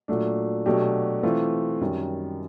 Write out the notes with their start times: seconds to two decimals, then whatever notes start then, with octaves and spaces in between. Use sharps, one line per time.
0.08 A#2 F#3 A3 D4
0.66 B2 F#3 A3 D4 G4
1.23 E3 A3 C4 F4
1.81 F#2 D#3 G3